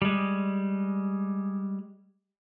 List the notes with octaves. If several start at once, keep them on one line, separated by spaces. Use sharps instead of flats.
G3 G#3